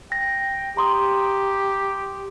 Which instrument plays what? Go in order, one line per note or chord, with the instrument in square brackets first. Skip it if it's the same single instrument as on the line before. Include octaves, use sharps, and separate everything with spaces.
[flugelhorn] G5 [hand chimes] A#6
[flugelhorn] G4 [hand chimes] A#5 C6 D#6